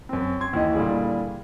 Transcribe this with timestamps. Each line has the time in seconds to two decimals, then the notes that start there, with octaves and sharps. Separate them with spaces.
0.09 F#2 C4
0.41 C6 G#6
0.53 D#2 E3 D#5
0.74 A#2 D3 G3 E4 G#4